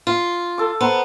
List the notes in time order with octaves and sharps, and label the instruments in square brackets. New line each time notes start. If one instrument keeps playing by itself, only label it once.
[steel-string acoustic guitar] F4
[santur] A4 D6
[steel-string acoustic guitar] B3 [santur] C5 A#5